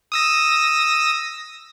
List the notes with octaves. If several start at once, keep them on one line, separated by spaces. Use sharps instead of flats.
D#6 E6 A#6